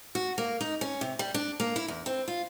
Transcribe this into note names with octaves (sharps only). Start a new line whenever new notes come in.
F#4
A#3
D#4
C#4
C3
G3
D4
A#3
E4
E2
C4
F4